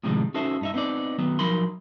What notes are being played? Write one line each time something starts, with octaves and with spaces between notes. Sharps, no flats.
A2 C3 D#3 F3 G3 G#3
C#4 D#4 F#4 A4 C5 E5
G2 D#4 E5
B3 C4 D#4 D5
D#3 F#3 B3
F3 F#3 D#4 A#4 B5 C6